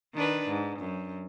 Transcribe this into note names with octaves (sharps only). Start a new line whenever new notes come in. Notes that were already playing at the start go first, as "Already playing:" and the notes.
D#3 D4 B4
G#2
F#2